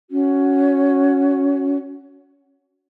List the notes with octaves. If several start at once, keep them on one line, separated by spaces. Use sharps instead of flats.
C#4 F#4